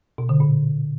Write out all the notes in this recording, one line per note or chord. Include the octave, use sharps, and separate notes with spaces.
B2
D3
A#2